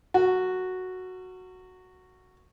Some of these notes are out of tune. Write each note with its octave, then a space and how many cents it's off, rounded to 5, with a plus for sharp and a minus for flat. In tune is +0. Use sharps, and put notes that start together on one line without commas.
F#4 +0 A#4 -40